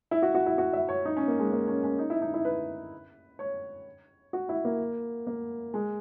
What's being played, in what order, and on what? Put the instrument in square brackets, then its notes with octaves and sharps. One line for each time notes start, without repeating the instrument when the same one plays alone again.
[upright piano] E4
F#4
F#4
E4
F#4
E5
C#5
D#4
C#4
A#3
G#3
A#3
C#4
C#4
D#4
E4
D#4
E4
B4
C#5
F#4
E4
A#3
A#3
G#3